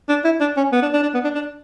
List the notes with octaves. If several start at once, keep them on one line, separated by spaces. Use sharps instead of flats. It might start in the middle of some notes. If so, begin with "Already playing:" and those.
D4
E4
D4
C#4
B3
D4
D4
D4
B3
D4
D4